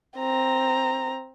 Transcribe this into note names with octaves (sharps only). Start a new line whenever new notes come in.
C4 A#5